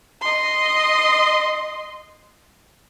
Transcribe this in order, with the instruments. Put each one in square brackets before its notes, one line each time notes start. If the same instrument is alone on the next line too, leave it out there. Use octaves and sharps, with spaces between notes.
[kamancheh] D#5 C6